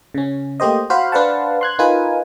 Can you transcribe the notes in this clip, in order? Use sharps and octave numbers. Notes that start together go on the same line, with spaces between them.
C#3 C#4
A3 A#3 G4 C5 D#5
F#4 C5 F5 B5
D4 B4 C5 F5 F#5 A5
C6 F#6 G#6
D#4 F4 A#4 B4 G#5